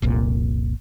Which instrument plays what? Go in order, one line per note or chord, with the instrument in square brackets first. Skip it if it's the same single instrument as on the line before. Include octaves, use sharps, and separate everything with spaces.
[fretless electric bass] F1 C2 A#2